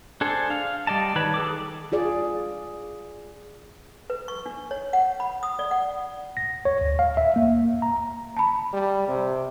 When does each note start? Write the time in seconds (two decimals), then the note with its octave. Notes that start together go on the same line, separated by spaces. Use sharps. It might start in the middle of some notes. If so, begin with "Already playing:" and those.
0.21 D4 G#4 A4 C5
0.50 F5
0.87 G3 D5 D#5 A5
1.16 D#3 B4 C#5 A5 B5
1.34 G#4 A4 D6
1.92 F4 G#4 D5
4.10 B4
4.28 C#6
4.46 D4
4.71 C#5
4.93 F#5
5.20 B5
5.43 D#6
5.59 D5
5.71 F#5
6.37 A#6
6.65 C#5
6.81 D2
6.99 F5
7.17 E5
7.36 A#3
7.82 A#5
8.37 A5 B5
8.73 G3
9.08 C3